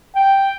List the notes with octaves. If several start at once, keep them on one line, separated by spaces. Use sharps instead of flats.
G5